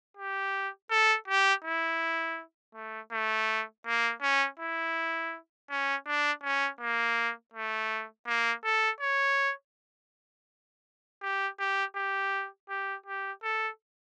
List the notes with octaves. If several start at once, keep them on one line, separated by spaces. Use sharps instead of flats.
G4
A4
G4
E4
A3
A3
A#3
C#4
E4
C#4
D4
C#4
A#3
A3
A#3
A4
C#5
G4
G4
G4
G4
G4
A4